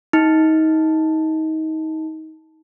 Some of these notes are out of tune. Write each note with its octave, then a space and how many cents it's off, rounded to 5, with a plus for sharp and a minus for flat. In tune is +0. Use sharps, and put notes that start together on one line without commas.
D#4 +25